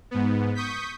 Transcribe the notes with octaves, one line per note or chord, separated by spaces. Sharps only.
G#2 B3
C#6 D#6 G6 B6